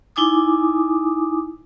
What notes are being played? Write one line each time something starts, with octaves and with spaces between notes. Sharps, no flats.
D#4 E4 G#5 D6 D#6